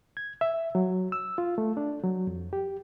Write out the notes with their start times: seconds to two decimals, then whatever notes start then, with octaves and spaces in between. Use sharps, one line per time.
0.17 G#6
0.41 E5
0.75 F#3
1.12 E6
1.38 F4
1.58 A3
1.77 D4
2.03 F#3
2.27 F2
2.53 G4